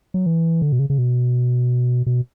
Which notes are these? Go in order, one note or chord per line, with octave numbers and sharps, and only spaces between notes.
F#3
E3
D3
B2
C#3
C#3
B2
B2